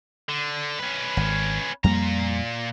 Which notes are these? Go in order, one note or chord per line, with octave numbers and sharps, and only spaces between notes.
D3
C#4 B4
G#1
F2 A#2 G3 A#3 A#5